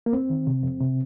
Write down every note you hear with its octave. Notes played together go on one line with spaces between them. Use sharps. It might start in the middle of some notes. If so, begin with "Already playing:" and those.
A#3
F2 C4
D#3
C3
F2
C3